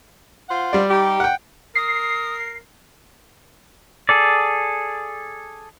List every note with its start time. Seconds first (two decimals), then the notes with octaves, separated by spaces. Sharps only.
0.48 F4 C5 F#5
0.73 G3 D5
0.89 D#4 G4
1.20 F#5 G5
1.75 A#4 D#6 C7
4.09 G#4 A4 D5